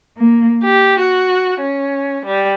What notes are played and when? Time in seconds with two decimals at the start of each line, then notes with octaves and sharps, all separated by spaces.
0.17 A#3
0.64 G4
1.00 F#4
1.61 C#4
2.26 G3